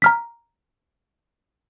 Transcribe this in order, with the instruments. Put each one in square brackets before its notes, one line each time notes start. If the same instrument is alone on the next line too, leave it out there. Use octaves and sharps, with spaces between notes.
[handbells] A#5 F6 B6